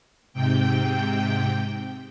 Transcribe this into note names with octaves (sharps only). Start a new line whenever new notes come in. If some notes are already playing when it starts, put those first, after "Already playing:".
G#2 C3 G5